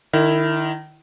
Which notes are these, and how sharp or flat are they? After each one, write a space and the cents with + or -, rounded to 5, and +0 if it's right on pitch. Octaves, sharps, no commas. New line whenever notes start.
D#3 -25 E4 +0